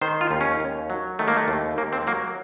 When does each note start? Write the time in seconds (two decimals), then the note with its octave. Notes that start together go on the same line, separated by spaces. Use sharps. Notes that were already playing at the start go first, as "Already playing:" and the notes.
0.02 D#3 C5
0.21 F4
0.31 D#2
0.41 C#4
0.60 D#2
0.90 F#3
1.19 D#3 A3
1.28 A#3
1.37 A3
1.48 D#2
1.78 D#2 A#3
1.93 C4
2.07 F#3 A#3